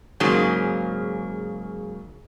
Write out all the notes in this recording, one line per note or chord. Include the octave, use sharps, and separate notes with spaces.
G#2 C#3 F#3 A#3 G#4